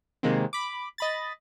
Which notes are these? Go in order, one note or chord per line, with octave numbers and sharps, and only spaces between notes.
C3 D#3 G#3 A#3 C4
B5 D6
D#5 B5 A6